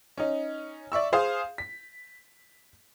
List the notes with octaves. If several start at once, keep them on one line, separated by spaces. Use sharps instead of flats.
C#4 D#4
D5 E5 C#6 E6
G#4 C5 F5 C6 D#6
B6